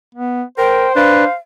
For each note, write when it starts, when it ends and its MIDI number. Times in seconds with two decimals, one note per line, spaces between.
0.15 0.43 59
0.58 0.87 70
0.58 1.33 72
0.58 0.96 79
0.96 1.25 62
0.96 1.25 71
0.96 1.34 77